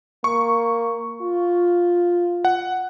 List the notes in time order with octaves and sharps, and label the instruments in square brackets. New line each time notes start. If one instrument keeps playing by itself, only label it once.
[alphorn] A#3 [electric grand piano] C#6
[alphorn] F4
[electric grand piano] F#5